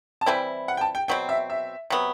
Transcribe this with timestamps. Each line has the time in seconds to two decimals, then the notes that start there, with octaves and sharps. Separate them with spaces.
0.21 A5
0.26 E3 G3 C4 E4 G5
0.68 F#5
0.77 G5
0.81 A5
0.95 G5
1.08 B2 F#3 C4 G5
1.29 E5
1.50 E5
1.90 C3 F#3 B3